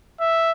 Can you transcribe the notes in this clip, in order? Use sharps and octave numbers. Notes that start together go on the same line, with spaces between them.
E5